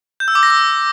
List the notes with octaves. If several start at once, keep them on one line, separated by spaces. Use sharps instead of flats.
G6
E6
D6
A#6
E6